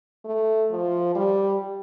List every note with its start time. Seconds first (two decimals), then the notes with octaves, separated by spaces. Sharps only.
0.25 A3
0.71 F3
1.15 G3